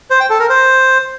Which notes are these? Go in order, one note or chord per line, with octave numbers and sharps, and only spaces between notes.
C5
G5
A4
A#4
C5